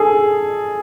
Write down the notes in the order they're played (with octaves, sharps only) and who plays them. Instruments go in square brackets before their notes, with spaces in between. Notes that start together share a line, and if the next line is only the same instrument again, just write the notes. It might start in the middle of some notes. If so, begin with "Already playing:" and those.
Already playing: [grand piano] G#4 A4